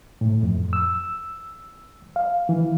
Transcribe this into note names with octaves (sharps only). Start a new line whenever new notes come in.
A2
F2
E6
F5
E3